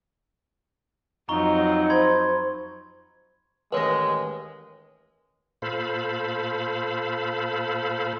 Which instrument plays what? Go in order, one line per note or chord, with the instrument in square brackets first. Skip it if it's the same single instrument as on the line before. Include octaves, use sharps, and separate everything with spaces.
[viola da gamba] F2 F#3 [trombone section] D#4 [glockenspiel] A#5 C#6 G7
[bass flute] C5 [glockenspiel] B5 C6 G#6
[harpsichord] A1 D#2 D#5 [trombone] G#3 [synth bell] B4 C#5
[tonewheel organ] A#2 A4 C5 F5 B5